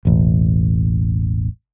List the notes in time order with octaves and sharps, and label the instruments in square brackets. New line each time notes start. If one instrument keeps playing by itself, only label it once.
[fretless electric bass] E1 A1